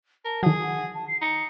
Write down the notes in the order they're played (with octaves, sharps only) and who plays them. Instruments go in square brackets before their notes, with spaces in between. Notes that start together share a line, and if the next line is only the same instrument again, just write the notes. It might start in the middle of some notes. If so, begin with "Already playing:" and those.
[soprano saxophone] A#4 [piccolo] A5
[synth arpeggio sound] D#3 F#3 [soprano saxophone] G#4
[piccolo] F#5
A5
C7
[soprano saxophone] D#4 [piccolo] C#7